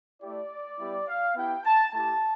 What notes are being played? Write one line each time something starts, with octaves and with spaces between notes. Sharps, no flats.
A3 E4 G4 D5
G3 B3 E4 G4
F5
B3 E4 G4 G5
A5
A3 E4 G4 A5